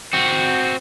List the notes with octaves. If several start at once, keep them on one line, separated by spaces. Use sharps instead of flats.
C4 F#4